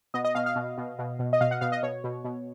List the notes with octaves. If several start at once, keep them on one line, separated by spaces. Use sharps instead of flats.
B2 D#5
D#5
B2 F5
F5
B2
B2
B2
B2
D#5
B2 F5
F#5
B2 F5
D#5
B2 C#5
B2
B2